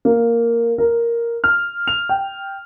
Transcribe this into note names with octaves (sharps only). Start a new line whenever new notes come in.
A#3
A#4
F6
F7
G5